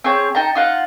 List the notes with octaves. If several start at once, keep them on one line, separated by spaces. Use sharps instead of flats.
C4 G#4 C#5 G6
D#4 G5 A5 A#5
D#4 F4 F#5